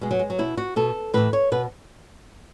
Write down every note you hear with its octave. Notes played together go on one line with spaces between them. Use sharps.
B2 G#3
F#3
G#3
F#3
B2 E4
F#4
B2 A4
A2 E3 B4
C#5
B2 B4